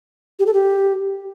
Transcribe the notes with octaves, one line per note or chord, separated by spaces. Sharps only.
G4
A4
G4